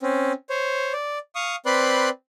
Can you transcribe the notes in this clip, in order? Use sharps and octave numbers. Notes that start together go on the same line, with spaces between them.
C4 C#4
C5 C#5
D5
F5 C#6 D#6
C4 B4 D5 B5 C6 F#6